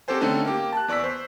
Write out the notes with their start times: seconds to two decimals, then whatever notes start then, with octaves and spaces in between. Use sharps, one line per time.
0.08 C4 F#4 G4 A4 C5 G#5
0.21 D3 A3 C4 C#4 D#4 A4
0.45 A#3 G4
0.73 A5 F#6
0.88 E2 D5 C#6 E6 B6
1.04 C5